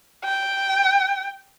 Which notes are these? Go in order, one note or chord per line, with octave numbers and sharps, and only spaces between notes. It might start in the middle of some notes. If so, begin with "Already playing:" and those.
G5